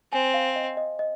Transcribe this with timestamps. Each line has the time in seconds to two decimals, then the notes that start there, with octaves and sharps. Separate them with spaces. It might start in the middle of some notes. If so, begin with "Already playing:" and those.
0.13 C4 G#5
0.34 F5
0.56 D#5
0.77 D#5
0.99 D#5